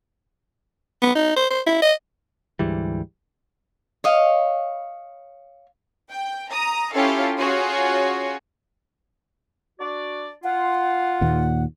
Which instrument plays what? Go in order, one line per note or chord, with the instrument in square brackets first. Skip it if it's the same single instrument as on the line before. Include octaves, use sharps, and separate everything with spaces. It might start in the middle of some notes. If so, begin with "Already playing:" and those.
[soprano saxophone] B3
D#4
C5
C5
E4
D#5
[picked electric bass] D2 G#2 E3 G3
[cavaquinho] C#5 D#5 F5
[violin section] G5
A#5 D#6
C#4 E4 F4 G4 A4 F5
C#4 F4 F#4 G#4 C#5
[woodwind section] D4 F#4 D5
[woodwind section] F4 [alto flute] F#5
[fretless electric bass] D#2 A#2